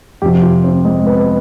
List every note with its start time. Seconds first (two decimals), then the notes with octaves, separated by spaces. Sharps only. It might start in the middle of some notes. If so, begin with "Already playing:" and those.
0.22 F2 C3 F3 G4
0.42 F4
0.64 C4
0.85 G#3
1.07 B3